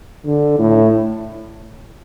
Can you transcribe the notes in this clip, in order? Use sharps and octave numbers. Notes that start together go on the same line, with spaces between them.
D3
A2